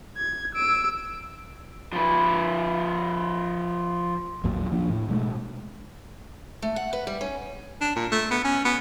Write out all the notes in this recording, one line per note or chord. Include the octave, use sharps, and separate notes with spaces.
G#6
E6 D7
F3 B4
G#1 D#2 A#2 F#3
F3 A#3 D4
A2
B2 G#3 A3
A3
F#5
B4
G3
C#4
D4
A#2
A3
B3
C#4
B3